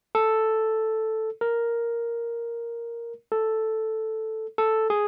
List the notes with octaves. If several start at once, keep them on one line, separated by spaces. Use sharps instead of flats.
A4
A#4
A4
A4
G#4